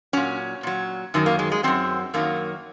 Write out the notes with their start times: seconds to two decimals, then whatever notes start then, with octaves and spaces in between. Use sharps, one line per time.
0.13 A#2 F#3 C#4
0.63 A#2 F#3
1.14 F#2 D#3 F#3
1.26 A#3
1.39 G#3
1.52 G#3
1.63 D#3 F#3 C4
1.68 F#2
2.14 F#2 D#3 F#3 A#3